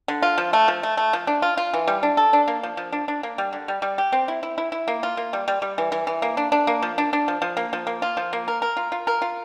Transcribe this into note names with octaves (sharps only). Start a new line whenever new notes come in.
D3
F4
F3
A3
F3
A3
A3
F3
D4
F4
F4
E3
G3
D4
A4
D4
A#3
F3
F3
D4
D4
A#3
G3
D3
G3
G3
G4
C4
E4
E4
E4
E4
A#3
F4
A#3
G3
G3
G3
E3
E3
E3
A#3
D4
D4
A#3
F3
D4
D4
F3
F3
A#3
F3
A#3
F4
F3
A#3
A#4
A#4
F4
F4
A#4
F4